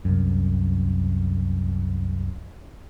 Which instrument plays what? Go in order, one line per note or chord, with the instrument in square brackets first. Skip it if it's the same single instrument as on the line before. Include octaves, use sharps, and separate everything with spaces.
[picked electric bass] C2 F#2